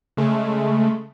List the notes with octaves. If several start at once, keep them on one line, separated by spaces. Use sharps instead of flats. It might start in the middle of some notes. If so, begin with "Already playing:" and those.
C#3 G#3 A3